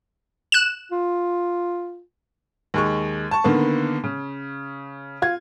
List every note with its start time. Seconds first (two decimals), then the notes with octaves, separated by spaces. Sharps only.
0.52 F#6 E7
0.92 F4
2.74 D#2 G#3 C#6
3.31 A5 C#6
3.44 D3 D#3 A#3 B3
4.04 C#3
5.22 F4 G#6